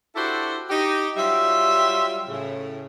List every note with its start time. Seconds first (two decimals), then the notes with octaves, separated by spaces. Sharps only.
0.16 D4 E4 F#4 G4 A4 C5
0.70 D#4 G4
1.17 F#3 G3 F4 E5
2.28 A2 C#3